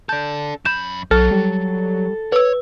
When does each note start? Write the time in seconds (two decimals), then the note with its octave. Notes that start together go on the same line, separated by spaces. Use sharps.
0.09 D4 A4 G6
0.65 F#2 B5 G6 E7
1.11 B1 F#3 A4 F6
1.31 G3
2.32 B4 C#5 E6